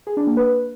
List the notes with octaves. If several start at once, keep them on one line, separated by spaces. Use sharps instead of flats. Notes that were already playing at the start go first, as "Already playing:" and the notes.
G#4
D4
A#3
B4